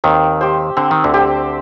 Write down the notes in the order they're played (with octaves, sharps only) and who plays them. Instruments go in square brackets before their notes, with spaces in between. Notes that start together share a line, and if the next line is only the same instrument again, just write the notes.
[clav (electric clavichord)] D#2 D#3 [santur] C4
[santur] G4 C5
[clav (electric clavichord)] D3 [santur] C4
[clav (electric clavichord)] D#3
D2 D3
[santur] G4 C5